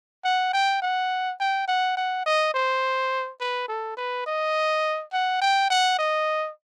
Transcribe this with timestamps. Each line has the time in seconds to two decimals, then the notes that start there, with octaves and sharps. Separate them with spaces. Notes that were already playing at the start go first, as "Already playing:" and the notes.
0.24 F#5
0.53 G5
0.82 F#5
1.40 G5
1.68 F#5
1.97 F#5
2.26 D#5
2.54 C5
3.40 B4
3.68 A4
3.97 B4
4.26 D#5
5.13 F#5
5.41 G5
5.70 F#5
5.99 D#5